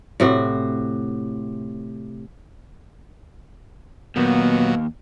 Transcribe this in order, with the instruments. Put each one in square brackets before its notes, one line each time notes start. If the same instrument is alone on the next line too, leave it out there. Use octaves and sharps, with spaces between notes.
[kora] A2 C3 F#4
[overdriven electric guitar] D#2 [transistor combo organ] A#2 F#3 [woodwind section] B3